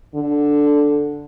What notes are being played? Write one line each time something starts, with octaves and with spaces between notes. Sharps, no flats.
D3